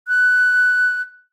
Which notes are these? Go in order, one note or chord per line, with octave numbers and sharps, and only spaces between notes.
F#6